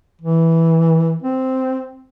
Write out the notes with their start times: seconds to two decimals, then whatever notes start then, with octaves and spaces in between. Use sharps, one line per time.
0.21 E3
1.23 C4